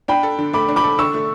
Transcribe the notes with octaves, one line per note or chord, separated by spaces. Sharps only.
D4 G5 B5
A4
D3
A3 B5 D6
D4
B5 D6
A4
D3 C#6 E6
A3